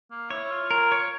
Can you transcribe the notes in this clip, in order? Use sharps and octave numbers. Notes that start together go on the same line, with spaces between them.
A#3
E4 C#5
F4
A#4
C#5